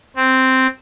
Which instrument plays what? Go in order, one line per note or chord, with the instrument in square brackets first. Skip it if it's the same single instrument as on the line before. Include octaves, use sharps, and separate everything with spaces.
[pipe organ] C4